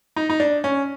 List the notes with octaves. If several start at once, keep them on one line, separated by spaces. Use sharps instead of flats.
D#4
D#4
D4
C#4